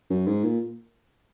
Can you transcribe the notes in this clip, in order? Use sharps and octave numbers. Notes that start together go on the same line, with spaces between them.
F#2
G#2
A#2